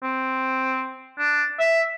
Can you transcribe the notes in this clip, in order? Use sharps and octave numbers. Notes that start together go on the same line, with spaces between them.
C4
D4
E5